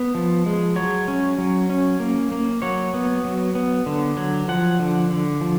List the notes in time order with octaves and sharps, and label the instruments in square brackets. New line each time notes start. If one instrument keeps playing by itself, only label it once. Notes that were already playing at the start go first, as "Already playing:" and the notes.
Already playing: [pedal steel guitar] B3
F3
G#3
F#3 C#5
C#4
F#3
C#4
A#3
A#3
F#3 C#5
B3
F#3
B3
D3
F#3
F3 F#5
D3
D3
F3